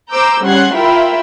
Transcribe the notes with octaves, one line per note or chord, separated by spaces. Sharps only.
C5 A#5 D6 E6 G6
C#3 G3 F#5 C6 F#6 G#6
E4 F4 A#4 E5 G5 B5